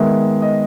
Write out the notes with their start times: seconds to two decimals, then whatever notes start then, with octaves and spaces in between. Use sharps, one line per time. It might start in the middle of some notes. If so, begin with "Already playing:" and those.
Already playing: D#3 G#3 B3 E5
0.42 D#5